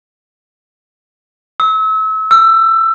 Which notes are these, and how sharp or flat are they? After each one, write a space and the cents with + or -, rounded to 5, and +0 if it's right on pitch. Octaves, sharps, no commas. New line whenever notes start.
E6 -35
E6 +20